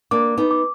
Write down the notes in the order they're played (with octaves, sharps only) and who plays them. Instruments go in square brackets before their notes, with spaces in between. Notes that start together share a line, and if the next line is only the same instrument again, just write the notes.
[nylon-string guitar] A#3 D4 [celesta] D6
[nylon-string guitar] B3 D#4
[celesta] D6